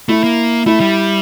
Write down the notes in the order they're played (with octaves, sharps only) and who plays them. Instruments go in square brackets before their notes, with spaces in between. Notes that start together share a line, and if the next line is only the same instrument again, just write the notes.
[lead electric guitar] A3 [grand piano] E4
[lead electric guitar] A#3
[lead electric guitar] A3 [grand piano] E4
[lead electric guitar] G3